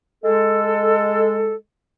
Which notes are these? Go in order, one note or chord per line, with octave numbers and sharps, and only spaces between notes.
G#3 A4